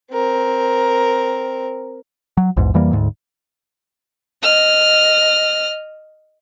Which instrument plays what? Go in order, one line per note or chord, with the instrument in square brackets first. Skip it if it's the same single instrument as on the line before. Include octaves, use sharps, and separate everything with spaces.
[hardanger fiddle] C4 A#4
[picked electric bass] F#3
A#1 E2 G#2
F2 E3 G3 A#3
D2 G#2
[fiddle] D#5 F6